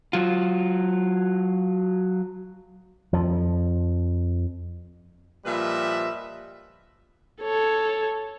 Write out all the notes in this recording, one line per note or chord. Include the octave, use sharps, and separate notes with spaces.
F#3 F4
F2 F3
A#2 F3 G3 B4 D#5 E5
A4 C#5